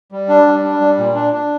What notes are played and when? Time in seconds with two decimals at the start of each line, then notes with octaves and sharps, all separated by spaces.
0.12 G3
0.28 D4
0.47 G3
0.64 D4
0.81 G3
0.98 A#2
1.15 D4
1.33 D4